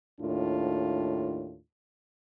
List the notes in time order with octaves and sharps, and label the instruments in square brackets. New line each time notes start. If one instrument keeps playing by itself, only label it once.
[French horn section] D#2 A2 D4 F4